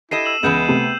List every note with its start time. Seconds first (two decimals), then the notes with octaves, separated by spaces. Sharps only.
0.11 E4 G4 A4 D#5 C7 D#7 E7
0.26 E6 E7 F#7
0.43 C#2 E3 G#3 B3 D#5 G6 E7
0.68 C3 A3